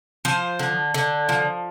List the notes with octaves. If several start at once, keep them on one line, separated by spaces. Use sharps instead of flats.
F3 C5
D3
D3
F3